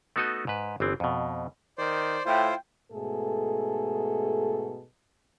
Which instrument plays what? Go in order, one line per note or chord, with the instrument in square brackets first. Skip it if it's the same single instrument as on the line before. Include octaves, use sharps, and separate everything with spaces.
[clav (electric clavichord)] A3 B3 D#4 F#4 A4 D#5
G#2 B4
G1 E3 C4
F2 B2
[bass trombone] D#3 [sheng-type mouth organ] C5 D5
[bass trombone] A2 [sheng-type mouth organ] E4 F4 C5 [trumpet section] G5
[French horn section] G#2 B2 A3 G#4 A4